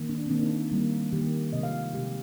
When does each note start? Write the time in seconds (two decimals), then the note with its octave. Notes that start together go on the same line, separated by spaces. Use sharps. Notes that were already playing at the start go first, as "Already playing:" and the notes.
Already playing: D#3 A#3
0.09 D4
0.26 C4
0.30 D#3 A#3 D4
0.43 D#4
0.71 D#3 G3 A#3
1.13 D#3 G3 A#3 G4
1.53 C3 F3 G#3 D#5
1.63 F5
1.94 C3 F3 G#3 G4